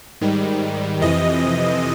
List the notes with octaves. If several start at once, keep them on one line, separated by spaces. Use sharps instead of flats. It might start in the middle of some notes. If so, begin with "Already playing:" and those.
G#2 D#3 G3
F2 C3 E3 D#5